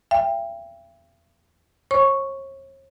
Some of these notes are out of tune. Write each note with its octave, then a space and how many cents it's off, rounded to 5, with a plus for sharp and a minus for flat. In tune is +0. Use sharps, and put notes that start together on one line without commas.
E5 +45 G5 +20
C#5 -40 C#6 +0